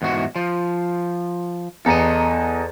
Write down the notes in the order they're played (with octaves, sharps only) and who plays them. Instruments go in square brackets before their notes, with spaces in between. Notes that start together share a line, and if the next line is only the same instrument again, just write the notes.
[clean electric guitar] E2 G#2 F#4
F3
[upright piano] E2 A#5 C#7 [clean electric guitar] A4 D#5